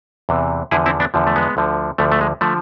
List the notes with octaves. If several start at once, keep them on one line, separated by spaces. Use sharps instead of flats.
E2 C3 E3
E2 D3 F3 E4 G#4
C4 E4
B3 D4
E2 D3 F3
A3
G#3 B3
D2 D3 F3
D2 D3 F3 A3
A3
G#3
D3 F3 A3